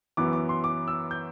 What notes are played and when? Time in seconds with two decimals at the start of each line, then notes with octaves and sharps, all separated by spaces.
0.17 F#2 E3 B3 D6
0.33 D6
0.49 C6
0.64 D6
0.88 E6
1.11 G6